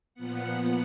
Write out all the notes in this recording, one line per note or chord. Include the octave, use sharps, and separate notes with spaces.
A#2 F3 B3 F#5